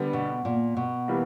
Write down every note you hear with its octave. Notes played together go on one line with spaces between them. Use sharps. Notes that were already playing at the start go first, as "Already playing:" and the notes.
Already playing: D3 G3 B3
B2
A#2
B2
E3 G3 A#3